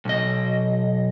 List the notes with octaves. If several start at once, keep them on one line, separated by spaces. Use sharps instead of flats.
B1 D#5